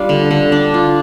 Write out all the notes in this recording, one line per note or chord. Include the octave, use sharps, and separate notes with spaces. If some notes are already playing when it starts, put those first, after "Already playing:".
Already playing: G3 D4 F4 F5
D3
D3
D4
F4